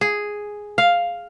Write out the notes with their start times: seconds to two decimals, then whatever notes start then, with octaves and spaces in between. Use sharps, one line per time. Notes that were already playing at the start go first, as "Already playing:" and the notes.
0.01 G#4
0.78 F5